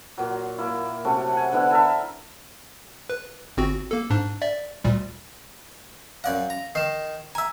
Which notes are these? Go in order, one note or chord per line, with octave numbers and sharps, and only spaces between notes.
A#2 F#3
A#3 E4
C3 F#3 A3 C#4
F#5 G#5
D3 B3 E4 D5
E4 A4 A#4 E5
B4
G1 C4 F#4
A#3 A4
G#2 D4
D5 E5
D2 A#2 G3
F#2 D5 F5 F#5
A#5
D#3 D#4 C7 E7
E5 G#5 A#5 E6